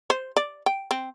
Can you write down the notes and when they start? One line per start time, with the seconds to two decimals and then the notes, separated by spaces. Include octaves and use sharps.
0.10 C5
0.37 D5
0.66 G5
0.91 C4